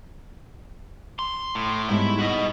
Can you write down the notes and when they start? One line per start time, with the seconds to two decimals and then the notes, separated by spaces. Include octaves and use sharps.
1.19 C6
1.55 A2
1.90 G#2 G3 B3 E4
2.19 F#4 D#5